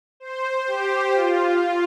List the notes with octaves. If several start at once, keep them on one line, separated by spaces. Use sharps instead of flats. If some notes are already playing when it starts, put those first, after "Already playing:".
C5
G4
F4